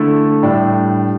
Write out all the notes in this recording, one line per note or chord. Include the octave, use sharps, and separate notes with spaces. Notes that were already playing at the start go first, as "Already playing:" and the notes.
Already playing: D3 A3 E4 A4
A2 G3 D4